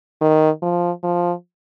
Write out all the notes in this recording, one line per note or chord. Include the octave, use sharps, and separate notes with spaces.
D#3
F3
F3